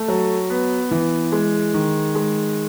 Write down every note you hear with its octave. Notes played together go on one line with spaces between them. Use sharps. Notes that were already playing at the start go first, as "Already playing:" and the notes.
Already playing: A3
F#3
B3
E3
G#3
D#3
G#3